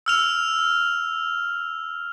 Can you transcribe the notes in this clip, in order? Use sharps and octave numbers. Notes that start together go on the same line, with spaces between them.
E6 F6 F7